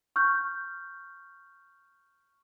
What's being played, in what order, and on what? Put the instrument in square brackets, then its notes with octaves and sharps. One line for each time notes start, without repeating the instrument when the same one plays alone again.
[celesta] C#6 F6 G6